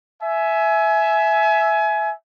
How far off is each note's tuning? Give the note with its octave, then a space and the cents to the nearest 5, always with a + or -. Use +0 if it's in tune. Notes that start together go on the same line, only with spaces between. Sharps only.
E5 +0 G#5 +25